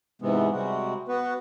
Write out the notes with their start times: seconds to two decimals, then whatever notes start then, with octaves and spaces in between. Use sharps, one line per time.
0.22 G#2 C3 E3 G#3 B3
0.52 C3 G3 G#3 F#4
1.08 B3 F#4 B4